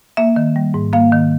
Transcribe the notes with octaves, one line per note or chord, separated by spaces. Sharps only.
A#3 E5
D#3
G3
G#2
A#3 F5
D#3